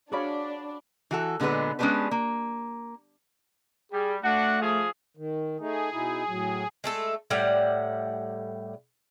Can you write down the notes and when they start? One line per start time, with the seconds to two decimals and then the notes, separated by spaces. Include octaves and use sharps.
0.12 D4 F#4 G#4 C#5 D5 F5 B5
1.11 E3 F#4 A4
1.40 A#2 D3 G#3 B3 B4
1.79 G#3 B3 C#4 D4 G4 B4
2.11 A#3
3.92 G3 G#4
4.22 A3 D4 F#4 F#5
4.60 F3 G#4
5.17 D#3
5.60 A3 D#4 G#4
5.92 B2 D#4 E4
6.28 A2 F#3
6.84 G#3 A3 A4
7.30 A2 G3 D5 F#5